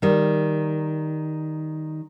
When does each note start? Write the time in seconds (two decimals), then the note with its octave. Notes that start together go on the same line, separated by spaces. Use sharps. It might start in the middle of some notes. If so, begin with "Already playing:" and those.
0.02 D#3 G3